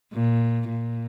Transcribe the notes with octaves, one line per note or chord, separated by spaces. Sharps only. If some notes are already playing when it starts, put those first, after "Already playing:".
A#2
A#2